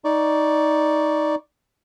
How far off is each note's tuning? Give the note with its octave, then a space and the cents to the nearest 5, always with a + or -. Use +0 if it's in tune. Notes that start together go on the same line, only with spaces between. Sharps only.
D#4 +10 D5 +0 C#6 +0